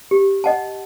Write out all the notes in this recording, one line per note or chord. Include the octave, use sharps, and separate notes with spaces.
G4
D#5 F#5 A5